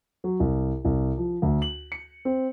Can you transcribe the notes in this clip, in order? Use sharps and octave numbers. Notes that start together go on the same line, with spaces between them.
F#3
C2
C2
F3
D2
F#7
C#7
C4